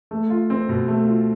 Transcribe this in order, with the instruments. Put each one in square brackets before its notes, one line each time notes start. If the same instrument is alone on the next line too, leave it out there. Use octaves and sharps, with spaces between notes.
[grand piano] A3
F4
C4
B2
A3
F4